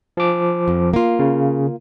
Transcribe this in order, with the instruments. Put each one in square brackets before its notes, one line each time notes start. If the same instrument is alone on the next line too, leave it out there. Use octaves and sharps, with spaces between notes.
[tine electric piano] F3 D6
[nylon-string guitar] F2
A#3 F4
[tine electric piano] C#3